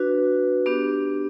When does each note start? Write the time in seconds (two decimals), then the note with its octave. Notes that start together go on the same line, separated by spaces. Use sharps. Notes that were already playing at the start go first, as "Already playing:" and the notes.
Already playing: D4 F#4 B4
0.66 B3 D4 G4